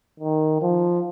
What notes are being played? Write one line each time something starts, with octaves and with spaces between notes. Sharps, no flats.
D#3
F3